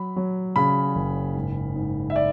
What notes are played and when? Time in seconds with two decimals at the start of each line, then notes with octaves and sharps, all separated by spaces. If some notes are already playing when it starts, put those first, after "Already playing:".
Already playing: F#3 B5
0.16 F#3
0.56 C#3 B5
0.95 F#1
1.35 G#2
1.76 G#2
2.10 E5
2.16 D5